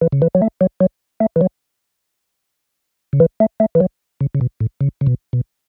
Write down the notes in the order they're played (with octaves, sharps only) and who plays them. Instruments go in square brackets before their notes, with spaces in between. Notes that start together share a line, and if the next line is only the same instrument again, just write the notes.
[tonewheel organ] E3
C#3
E3
F#3
A3
F#3
F#3
A3
E3
F#3
C#3
E3
A3
A3
E3
F#3
C#3
C#3
B2
A2
C#3
C#3
B2
B2